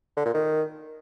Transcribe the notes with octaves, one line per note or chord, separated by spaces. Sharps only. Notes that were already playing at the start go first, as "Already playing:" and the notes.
D3
A#2
D#3